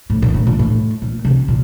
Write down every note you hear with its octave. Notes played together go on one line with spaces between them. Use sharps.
A2
A#2
A2
A#2
A2
A#2
C3
A#2